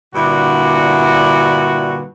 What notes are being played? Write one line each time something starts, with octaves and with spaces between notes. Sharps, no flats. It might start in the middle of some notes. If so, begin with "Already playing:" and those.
G2 A#2 D3 E4 F#4